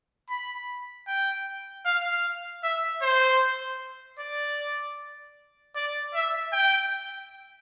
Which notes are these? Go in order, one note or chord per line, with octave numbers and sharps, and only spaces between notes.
B5
G5
F5
E5
C5
D5
D5
E5
G5